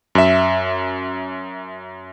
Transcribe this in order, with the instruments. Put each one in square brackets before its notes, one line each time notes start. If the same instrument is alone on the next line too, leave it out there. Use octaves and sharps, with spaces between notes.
[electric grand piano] F#2 E5